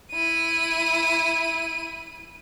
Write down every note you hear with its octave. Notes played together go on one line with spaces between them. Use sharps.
E4 D#7